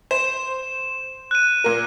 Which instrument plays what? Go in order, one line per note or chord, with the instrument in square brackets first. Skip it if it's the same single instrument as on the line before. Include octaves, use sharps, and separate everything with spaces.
[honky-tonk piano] C5 [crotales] E7
[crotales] F#6 D#7
[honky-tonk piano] A#2 A#4